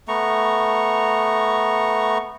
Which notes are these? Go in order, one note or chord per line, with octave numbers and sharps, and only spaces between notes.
A3 B3 A#5 C#6